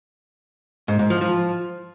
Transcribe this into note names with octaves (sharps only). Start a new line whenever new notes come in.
G#2
G#2
F3
F3